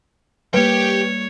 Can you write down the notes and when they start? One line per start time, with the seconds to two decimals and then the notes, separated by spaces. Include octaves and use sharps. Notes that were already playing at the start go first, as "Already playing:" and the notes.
0.54 G3 A#3 G4 B4 C#5 G5